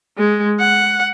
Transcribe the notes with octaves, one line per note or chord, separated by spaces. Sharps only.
G#3
F#5